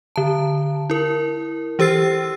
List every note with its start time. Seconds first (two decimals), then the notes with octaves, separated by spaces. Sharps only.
0.16 D3 A5
0.90 E4 A#4
1.79 E3 G4 C5 E6 A6 C7